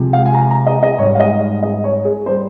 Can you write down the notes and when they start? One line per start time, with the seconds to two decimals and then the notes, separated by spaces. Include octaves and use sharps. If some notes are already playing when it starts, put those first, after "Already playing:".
Already playing: C3 F3 G#3
0.13 F5
0.26 G#5
0.34 A#5
0.51 A#5
0.67 D#5
0.83 D#5
0.98 G#2 C#5
1.02 G3
1.15 F5
1.20 D#5
1.63 D#5
1.84 C#5
2.05 G#4
2.26 G3 C5